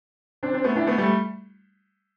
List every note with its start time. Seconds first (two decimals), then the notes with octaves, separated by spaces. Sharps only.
0.43 C4 D4
0.53 C4 D4
0.64 A3 B3
0.76 D4 E4
0.87 A3 B3
0.98 G3 A3